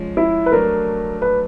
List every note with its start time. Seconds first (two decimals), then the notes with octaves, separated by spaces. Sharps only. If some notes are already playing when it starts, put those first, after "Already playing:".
Already playing: F3 G#3 C#4
0.17 E4
0.46 B4
0.52 F#3 A3 D4 A#4
1.22 B4